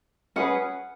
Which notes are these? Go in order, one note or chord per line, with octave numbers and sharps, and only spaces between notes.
C#4 G#4 B4 F#5